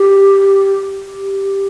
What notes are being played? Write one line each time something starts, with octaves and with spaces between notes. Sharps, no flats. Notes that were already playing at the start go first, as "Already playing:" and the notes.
Already playing: G4
G4